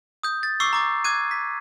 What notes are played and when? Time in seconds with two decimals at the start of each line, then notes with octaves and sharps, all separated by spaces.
0.23 D#6 G6
0.43 A6
0.60 C#6 D6 E6 C7
0.73 A#5 D6 A6
1.04 D6 F#6 G#6 D#7
1.31 B6